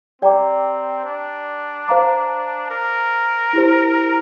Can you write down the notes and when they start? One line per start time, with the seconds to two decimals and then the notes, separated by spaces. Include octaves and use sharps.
0.22 C4 G4 D5 G5 A#5 D6
1.05 D4
1.88 C5 F5 A#5 D6
2.70 A#4
3.53 E4 G4 C5